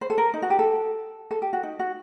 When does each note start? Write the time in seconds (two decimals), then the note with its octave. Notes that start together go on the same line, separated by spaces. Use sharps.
0.01 C5
0.10 A4
0.18 A#4
0.34 D#4
0.42 F#4
0.50 G4
0.59 A4
1.31 A4
1.42 G4
1.53 F#4
1.63 D#4
1.79 F#4